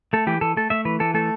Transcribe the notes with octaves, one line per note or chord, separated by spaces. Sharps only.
A3 A4
E3 G4
E3 A4
A3 A4
A3 E5
E3 B4
E3 A4
A3 A4